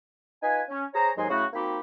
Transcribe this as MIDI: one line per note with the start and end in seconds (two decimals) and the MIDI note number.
0.42 0.62 63
0.42 0.62 65
0.42 0.62 71
0.42 0.62 80
0.69 0.85 61
0.94 1.10 68
0.94 1.10 72
0.94 1.10 73
0.94 1.10 82
1.16 1.29 39
1.16 1.29 44
1.16 1.29 54
1.16 1.29 75
1.16 1.29 80
1.16 1.29 84
1.29 1.45 49
1.29 1.45 54
1.29 1.45 57
1.29 1.45 64
1.29 1.45 66
1.53 1.79 58
1.53 1.79 60
1.53 1.79 63
1.53 1.79 66
1.53 1.79 67
1.53 1.79 83